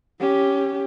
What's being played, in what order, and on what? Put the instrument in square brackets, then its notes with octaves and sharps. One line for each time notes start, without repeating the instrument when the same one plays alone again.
[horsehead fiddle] C#4 G4